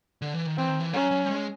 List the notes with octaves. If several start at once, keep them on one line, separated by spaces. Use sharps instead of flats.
D3
E3
D#3
E3 C4
D#3
E3
F#3 C#4
F#3
G3
G#3